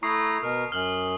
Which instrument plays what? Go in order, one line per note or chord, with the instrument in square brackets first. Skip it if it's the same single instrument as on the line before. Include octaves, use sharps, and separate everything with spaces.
[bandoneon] A3 E4 A#5 [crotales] C#6 D#6 C7
[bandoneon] B2 A#4
[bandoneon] F#2 [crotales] F6 F#7